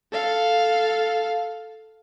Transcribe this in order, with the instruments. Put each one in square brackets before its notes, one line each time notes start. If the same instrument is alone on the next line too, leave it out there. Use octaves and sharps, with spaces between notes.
[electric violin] A4 F5